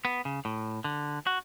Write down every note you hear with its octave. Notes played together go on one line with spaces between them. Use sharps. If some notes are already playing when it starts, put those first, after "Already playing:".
B3
C#3
A2
D3
F#4